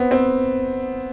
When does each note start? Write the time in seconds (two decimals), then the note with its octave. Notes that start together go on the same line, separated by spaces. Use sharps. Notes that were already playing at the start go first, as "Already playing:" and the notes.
Already playing: B3 C4
0.11 C4